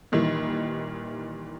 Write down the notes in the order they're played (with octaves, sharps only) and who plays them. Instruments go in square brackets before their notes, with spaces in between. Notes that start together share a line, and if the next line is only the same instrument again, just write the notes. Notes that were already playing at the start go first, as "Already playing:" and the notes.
[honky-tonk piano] A#2 D#3 E3 G3 E4